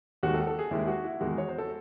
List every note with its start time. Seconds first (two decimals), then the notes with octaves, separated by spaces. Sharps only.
0.23 D#2 D#3 G#3 F#4
0.34 A4
0.47 A4
0.59 G#4
0.71 D#2 D#3 G#3 E4
0.88 F#4
1.04 E4
1.20 E2 D#3 G#3 F#4
1.38 C#5
1.48 C5
1.58 A4